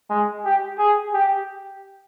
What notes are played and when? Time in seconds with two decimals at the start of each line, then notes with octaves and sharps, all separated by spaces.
0.10 G#3
0.45 G4
0.78 G#4
1.14 G4